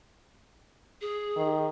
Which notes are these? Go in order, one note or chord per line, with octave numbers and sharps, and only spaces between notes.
G#4
D#3